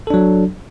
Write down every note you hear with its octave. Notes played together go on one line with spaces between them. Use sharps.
F#3 D4 A4